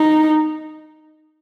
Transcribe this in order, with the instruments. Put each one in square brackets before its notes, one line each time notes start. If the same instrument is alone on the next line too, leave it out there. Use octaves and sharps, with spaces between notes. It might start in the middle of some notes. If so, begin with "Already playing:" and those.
Already playing: [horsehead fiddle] D#4